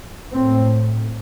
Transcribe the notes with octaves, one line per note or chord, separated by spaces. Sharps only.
A2 C4